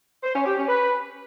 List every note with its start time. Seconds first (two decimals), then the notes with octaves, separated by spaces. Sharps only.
0.23 C5
0.35 C#4
0.46 G4
0.57 C#4
0.69 B4